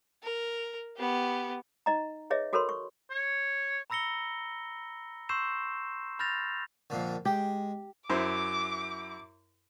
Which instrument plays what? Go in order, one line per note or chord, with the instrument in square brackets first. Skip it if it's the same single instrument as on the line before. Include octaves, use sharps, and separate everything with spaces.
[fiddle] A#4
B3 G4
[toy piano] D#4 D#5 A#5
G#4 B4 C#5 D#5 E5
F#4 A4 A#4 C#5 B5 C6
C#6
[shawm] C#5
[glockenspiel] A#5 B5 E6 A#6 C#7 G7
C6 C#6 E6 G6 C7 E7
B5 F6 G6 A6 A#6 F7
[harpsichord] F2 A#2 D3
[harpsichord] G#3 [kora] G4
[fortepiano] F#2 E4 C5 [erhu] D6